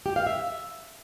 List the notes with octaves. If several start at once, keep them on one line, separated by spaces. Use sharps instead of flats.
G4
F5
E5